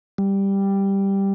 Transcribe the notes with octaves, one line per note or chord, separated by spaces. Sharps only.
G3